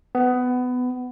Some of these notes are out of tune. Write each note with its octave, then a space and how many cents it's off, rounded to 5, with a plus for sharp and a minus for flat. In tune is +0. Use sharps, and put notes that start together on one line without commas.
B3 +20